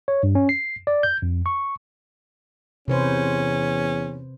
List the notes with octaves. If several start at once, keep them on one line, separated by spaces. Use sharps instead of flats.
C#5
G2
C#4
C7
D5
G6
F2
C#6
E2 C3 C#4 B4 C5